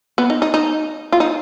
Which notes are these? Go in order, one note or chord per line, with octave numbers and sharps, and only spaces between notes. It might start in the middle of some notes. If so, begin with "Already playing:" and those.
B3
D#4
D#4
D#4
F4
D#4